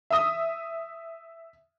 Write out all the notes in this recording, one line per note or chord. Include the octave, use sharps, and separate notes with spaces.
E5 D#6